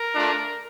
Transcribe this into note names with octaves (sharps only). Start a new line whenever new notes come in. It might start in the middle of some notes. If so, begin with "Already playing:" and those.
Already playing: A#4
A3 D4 F4